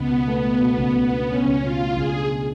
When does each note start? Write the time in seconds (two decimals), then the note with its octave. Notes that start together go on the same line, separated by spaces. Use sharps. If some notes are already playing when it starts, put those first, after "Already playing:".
Already playing: C#2 B3
0.10 B2
0.28 A3
0.43 A3
0.61 B2
0.78 C#2
0.95 C#2
1.11 D4
1.28 B2 C#4
1.45 C#2
1.61 B2 F4
1.79 A3
1.95 C#2 G#4
2.12 D4
2.29 B2